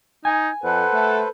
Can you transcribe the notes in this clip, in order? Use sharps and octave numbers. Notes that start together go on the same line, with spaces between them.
D#4 G#5
F2 A4 B4 C5 F#5
A3